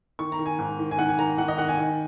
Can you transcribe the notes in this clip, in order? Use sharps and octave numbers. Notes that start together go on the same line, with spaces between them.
D#3 C#6
A#5
D#3
G#5
G#2
D#3
G#5
D#3 F#5
G#5
D#3 A#5
D#3 F#5
D#5
D#3 F#5
G#5
D#3